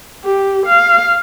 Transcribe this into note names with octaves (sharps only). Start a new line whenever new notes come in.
G4
F5